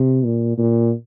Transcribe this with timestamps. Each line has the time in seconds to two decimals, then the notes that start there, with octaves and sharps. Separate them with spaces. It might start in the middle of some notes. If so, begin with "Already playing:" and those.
Already playing: C3
0.24 A#2
0.58 A#2